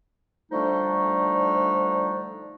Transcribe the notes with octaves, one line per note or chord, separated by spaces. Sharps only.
D3 F3 G3 A3 D4 D#4